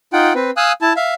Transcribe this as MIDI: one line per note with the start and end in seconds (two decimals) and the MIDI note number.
0.13 0.33 63
0.13 0.33 65
0.13 0.33 78
0.13 0.33 79
0.35 0.51 60
0.35 0.51 71
0.57 0.72 77
0.57 0.72 80
0.57 0.72 87
0.57 0.72 88
0.57 0.72 90
0.82 0.93 64
0.82 0.93 81
0.96 1.14 76
0.96 1.14 77